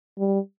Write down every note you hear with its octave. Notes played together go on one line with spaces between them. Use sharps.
G3